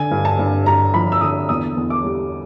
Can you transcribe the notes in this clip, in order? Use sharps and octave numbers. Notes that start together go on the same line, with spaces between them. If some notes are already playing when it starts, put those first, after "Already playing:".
Already playing: D3 G#5
G2
A5
G2
G2 A#5
F3 B5
E6
D3 D#6
E2 D#6
E2
D6
G3